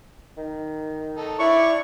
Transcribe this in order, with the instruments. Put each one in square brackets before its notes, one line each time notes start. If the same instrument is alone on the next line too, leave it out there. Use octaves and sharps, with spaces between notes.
[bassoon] D#3
[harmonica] D#4 A4
[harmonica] D4 C#5 D5 [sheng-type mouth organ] E4 [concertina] C#6